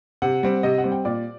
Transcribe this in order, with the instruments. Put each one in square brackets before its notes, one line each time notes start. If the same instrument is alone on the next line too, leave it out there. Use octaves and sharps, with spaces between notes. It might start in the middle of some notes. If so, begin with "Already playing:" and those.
[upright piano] C3 F#5
G3 C4
C3 D#5
F#5
G3 C4
G5
A#2 D5